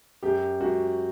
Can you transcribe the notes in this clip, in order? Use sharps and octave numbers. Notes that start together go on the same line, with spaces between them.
F#2 G4
F#2 F#4